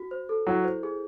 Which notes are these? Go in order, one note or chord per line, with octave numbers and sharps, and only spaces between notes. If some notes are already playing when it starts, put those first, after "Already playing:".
Already playing: F#4
C5
A4
F#3 E4
C5
G#4